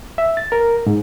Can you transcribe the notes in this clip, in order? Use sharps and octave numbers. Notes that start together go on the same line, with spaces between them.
E5
A6
A#4
G#2